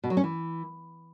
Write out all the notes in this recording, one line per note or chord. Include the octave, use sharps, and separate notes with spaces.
B2
F#3
C#4
E3